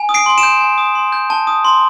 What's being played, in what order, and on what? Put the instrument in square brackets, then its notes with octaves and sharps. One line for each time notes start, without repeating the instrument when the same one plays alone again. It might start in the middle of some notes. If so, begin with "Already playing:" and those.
Already playing: [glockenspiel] G#5
D#6
C7 D7
C6
D7 E7
G6
G#5
D#6
C6
G6
A5
D#6
C6